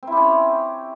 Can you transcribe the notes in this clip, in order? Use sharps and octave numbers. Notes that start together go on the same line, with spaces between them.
C4 C#4 E4 G4